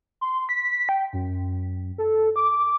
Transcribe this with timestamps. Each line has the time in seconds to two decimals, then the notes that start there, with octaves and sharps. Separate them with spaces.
0.21 C6
0.49 B6
0.89 G5
1.13 F#2
1.98 A4
2.36 D6